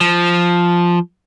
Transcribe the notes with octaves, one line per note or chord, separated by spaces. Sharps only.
F3